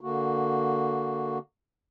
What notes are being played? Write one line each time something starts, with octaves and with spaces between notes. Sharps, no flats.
D3 A#3 F#4